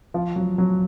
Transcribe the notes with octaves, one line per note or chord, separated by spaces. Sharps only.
F3
F#3
F#3